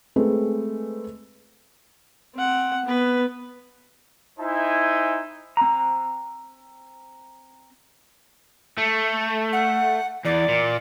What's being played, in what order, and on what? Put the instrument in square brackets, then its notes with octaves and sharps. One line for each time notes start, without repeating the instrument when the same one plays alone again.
[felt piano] G#3 A3 C4 G#4 B4
[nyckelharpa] C4 F#5
B3 B4
[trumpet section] D#4 E4 C5 E5 G#5
[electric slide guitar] C4 A#5
[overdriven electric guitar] A3
[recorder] F#5
[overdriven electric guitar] E2 [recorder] D5
[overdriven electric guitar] A#2